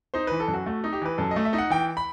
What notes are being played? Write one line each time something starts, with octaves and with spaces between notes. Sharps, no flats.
D#4 C5
E3 B4
A4
F#2
F#4
A3 F#4
D#4
G4
E3 B4
F#2 A4
D#5
A3
E5
D#4
F#5
E3 G5
B5